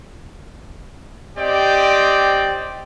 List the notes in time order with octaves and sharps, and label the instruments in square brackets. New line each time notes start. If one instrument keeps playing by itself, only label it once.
[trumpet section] C4 G4 D5 D#5 G5